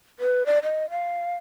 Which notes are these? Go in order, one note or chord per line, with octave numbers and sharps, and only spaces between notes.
B4
D5
D#5
F5